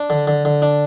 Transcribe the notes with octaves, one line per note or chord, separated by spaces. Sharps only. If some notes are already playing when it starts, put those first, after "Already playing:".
Already playing: D4
D3
D3
D3
D4